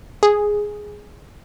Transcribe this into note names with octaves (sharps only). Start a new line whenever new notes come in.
G#4